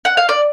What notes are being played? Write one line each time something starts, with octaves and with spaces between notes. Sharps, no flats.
F#5
F5
D5